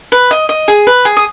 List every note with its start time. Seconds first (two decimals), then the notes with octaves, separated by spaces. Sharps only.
0.12 B4
0.31 D#5
0.49 D#5
0.68 G#4
0.87 B4
1.05 G#4
1.17 D#6